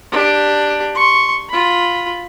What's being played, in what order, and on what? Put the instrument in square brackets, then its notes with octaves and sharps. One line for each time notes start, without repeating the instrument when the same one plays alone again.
[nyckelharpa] D4 G4
C6 C#6
F4 B5